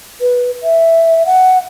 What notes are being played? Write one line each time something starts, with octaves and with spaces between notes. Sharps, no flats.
B4
E5
F#5